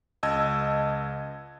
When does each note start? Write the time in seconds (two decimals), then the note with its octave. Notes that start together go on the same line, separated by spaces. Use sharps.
0.23 C#2 D#5 A5 E6 G#6